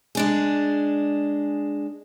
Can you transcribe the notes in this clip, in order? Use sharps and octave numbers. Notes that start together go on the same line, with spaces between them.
G#3 D4 G#4